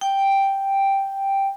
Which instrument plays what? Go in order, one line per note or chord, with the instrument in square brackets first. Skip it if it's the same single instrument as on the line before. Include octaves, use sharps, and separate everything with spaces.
[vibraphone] G5